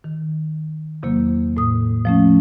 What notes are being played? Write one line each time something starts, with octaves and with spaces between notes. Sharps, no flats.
D#3
E2 C3 F#3 A#3
A2 D#6
F3 A3 C#4